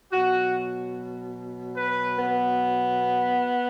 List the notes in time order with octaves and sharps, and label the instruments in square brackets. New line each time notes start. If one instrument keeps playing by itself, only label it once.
[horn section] B2 F#3 F#4
B4
B3